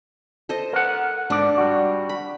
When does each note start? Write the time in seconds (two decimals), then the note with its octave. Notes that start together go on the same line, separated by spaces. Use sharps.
0.49 A4 C5 D#5
0.73 A#4 F#5
1.30 G#2 D4 D5
1.58 G3 F#4
2.09 B5